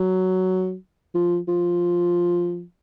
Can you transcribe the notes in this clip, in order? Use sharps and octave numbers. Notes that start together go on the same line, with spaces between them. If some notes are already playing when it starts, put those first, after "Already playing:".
Already playing: F#3
F3
F3